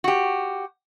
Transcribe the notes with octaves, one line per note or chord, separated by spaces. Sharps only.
F#4 G4